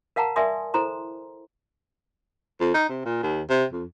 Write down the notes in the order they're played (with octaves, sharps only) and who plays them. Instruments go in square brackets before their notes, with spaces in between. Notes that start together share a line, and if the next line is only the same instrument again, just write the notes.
[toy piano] A#4 F5 F#5 A5 A#5
A#4 D5 E5 G#5 C6 D#6
E4 A4 C5 A#5 C6
[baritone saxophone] F2
D#4
C3
A#2
D#2
C3
F2